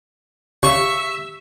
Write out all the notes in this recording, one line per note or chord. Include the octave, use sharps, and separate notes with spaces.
C#3 G4 E5 C#6